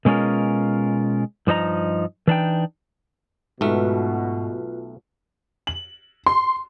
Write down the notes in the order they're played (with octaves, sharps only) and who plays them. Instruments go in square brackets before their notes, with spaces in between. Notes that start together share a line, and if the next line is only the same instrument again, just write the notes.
[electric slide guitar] B2 G#3 C#4 F4 A#4
G2 F3 D#4 D#5 A#5
E3 D4 D#4 G5
[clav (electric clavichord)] B1 A3 [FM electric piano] G#2 [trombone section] B2 [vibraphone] F4 F#4 B4
[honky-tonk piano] F#7
C6